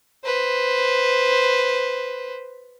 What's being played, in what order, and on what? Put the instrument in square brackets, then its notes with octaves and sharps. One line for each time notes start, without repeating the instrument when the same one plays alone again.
[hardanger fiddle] B4 C5